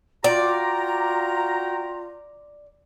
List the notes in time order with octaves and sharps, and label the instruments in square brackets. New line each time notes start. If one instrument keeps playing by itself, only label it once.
[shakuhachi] F4 [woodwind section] F#4 G5 A#5 [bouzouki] D5